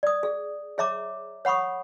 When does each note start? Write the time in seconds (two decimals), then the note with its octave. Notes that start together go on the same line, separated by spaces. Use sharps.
0.03 D5 D#6
0.23 G#4
0.78 G#4 C#5 E5 A#5 D6
1.45 C#5 F#5 B5 C#6 D#6